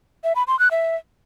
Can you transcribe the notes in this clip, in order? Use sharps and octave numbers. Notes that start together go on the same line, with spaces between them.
E5
B5
C6
F#6
E5